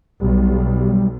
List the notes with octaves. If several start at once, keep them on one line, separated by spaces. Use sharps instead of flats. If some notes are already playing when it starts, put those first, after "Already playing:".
B1 G3